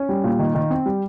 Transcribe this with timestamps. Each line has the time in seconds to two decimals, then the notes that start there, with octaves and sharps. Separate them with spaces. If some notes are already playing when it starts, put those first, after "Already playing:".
Already playing: C#4
0.09 G3
0.24 A#2
0.39 D#3
0.55 D#3
0.70 C4
0.86 G3